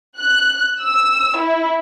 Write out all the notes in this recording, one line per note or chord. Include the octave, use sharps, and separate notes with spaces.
F#6
E6
E4